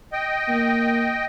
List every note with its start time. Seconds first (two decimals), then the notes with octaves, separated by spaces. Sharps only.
0.13 D#5 G5
0.48 A#3